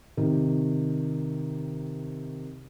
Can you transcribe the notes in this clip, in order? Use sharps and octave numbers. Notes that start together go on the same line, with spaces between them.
C3 D#3